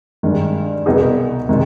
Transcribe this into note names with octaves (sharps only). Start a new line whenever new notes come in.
G2 D#3 G#3
C2 B2 B3 D#4 G#4
C3 D#3 G#3